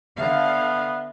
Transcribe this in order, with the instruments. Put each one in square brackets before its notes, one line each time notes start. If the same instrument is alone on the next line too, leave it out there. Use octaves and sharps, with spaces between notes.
[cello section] D3 F5 [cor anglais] B3 [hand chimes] E5